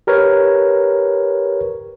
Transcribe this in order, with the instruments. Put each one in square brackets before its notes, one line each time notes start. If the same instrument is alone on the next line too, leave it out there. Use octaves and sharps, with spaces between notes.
[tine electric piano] G4 A#4 B4 C#5